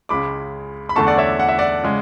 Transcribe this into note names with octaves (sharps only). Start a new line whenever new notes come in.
C#2 C#3 G#3 B5 D6
B5
E2 D3 A3 A5 C#6
D5 F#5
C#5 E5
F#5
E5
D5 F#5
C#3 G#3